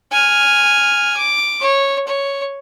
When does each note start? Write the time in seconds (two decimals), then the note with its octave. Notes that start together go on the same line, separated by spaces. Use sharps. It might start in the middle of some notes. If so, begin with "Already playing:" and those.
0.12 G#5 F6
1.17 D6
1.61 C#5
2.07 C#5